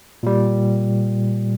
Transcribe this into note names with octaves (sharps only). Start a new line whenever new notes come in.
A#2 G3